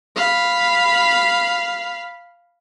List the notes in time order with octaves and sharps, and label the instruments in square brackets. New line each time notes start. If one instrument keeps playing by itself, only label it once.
[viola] F5 B5